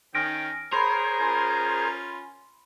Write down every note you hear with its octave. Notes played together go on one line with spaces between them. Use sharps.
D#3 C#4 G5 F6 A#6 D7
G#4 A#4 C5 C#5 B5 C6
C#4 F4